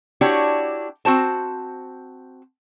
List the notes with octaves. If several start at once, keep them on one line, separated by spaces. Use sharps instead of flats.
D4 E4 F#4 G4 C#5
C4 F#4 C5 A5